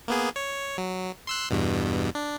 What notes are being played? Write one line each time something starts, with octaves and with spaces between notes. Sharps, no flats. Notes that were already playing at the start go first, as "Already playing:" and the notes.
A#3 B3 G#4
C#5
F#3
C6 E6 F#6
E2 G2 B2
D4